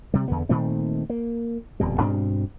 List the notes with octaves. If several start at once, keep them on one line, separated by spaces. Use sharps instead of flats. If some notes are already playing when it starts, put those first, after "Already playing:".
C3 G3
E2 D3 B3
A#2 D#3 A3 C4
A#3
D#1 F2 B2 G3
G2 B2 C4 D4